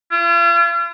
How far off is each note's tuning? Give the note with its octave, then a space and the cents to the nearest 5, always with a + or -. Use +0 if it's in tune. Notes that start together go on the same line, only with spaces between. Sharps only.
F4 -45